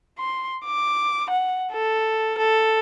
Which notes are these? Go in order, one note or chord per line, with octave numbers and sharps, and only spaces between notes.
C6
D6
F#5
A4
A4